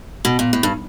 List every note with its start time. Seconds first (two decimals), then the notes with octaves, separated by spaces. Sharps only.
0.25 B2
0.39 A#2
0.53 A2
0.63 G2